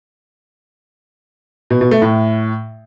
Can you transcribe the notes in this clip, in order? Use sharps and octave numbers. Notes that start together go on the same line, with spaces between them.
B2
B2
A3
A2